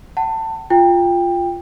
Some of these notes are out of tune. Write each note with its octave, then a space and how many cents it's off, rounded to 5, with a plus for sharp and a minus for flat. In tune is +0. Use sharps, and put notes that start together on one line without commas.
F#5 +40 A5 +20
F4 +0 G5 +20